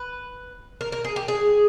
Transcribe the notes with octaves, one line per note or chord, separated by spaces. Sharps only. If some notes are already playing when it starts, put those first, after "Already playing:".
Already playing: B4
A#4
A#4
G#4
G4
G#4